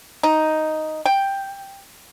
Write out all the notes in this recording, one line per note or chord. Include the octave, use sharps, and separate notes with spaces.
D#4
G5